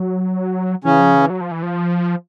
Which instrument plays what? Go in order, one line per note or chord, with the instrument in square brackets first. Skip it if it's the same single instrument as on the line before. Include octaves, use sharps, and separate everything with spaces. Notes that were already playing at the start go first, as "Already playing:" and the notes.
Already playing: [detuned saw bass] F#3
[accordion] C#3 C#4 [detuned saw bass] E3
[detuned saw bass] F3
E3
F#3
F3
E3
F3